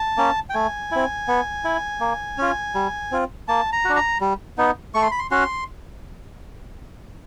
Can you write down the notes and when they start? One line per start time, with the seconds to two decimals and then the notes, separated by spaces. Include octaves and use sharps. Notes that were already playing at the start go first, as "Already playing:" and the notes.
Already playing: A5
0.17 A#3 C#4
0.49 G5
0.54 A3 G#5
0.91 C4 E4
1.28 B3
1.64 E4
2.00 A#3
2.38 C#4 F4
2.75 G3
3.12 C4 F4
3.48 A#3 A5
3.72 A#5
3.85 D4 F#4
3.96 A#5
4.21 G3
4.58 B3 D#4
4.94 A3 C#6
5.02 C6
5.11 B5
5.19 C6
5.31 C#4 F#4 C6